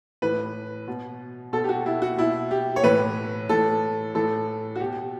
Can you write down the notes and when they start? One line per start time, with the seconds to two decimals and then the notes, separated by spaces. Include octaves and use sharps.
0.22 A2 E3 B4
0.88 B2
1.53 B2 A4
1.64 G4
1.69 F#4
1.86 E4
2.02 F#4
2.18 B2 E4
2.51 G4
2.76 C#5
2.83 A2 E3 B4
3.49 A2 E3 A4
4.15 A2 E3 A4
4.76 F#4
4.80 B2 G4